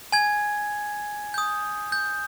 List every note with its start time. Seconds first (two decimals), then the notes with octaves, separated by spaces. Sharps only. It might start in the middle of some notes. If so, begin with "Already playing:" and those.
0.12 G#5 G#6
1.34 D#6 G6
1.92 G6